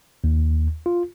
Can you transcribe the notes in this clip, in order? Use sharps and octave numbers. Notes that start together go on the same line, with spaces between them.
D#2
F4